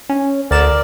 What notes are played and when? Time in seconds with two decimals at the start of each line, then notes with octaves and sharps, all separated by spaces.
0.09 C#4
0.51 D2 A#4 D5 A6 E7